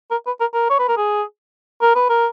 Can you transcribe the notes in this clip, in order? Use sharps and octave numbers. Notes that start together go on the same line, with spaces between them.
A#4
B4
A#4
A#4
C#5
B4
A#4
G#4
A#4
B4
A#4